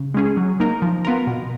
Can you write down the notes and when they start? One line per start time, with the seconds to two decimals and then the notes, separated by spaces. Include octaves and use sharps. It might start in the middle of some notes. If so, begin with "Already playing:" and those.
Already playing: C#3
0.14 G#3 C#4 G#4
0.37 F#3
0.60 A#3 D#4 A#4
0.82 F3
1.05 B3 F4 A#4
1.27 B2